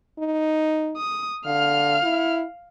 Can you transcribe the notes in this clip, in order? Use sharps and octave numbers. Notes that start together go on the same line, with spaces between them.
D#4
D#6
D3 F5 F6
E4